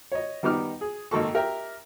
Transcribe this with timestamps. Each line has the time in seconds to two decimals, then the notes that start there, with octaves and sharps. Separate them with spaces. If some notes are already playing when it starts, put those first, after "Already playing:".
0.12 C#5 D#5
0.43 D#3 G3 B3 D#4 D6 F6
0.81 G#4
1.11 G#1 D#3 A#3 A4 C#6
1.34 G4 A#4 E5 G5